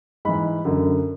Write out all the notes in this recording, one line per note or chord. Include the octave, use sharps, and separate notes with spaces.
G#2 E3 B5
F#2 D3